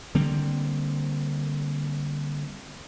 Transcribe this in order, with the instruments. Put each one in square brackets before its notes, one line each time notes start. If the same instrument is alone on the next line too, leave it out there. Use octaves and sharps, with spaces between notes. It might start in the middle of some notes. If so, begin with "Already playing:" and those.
[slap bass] D3 G3 A#3 C4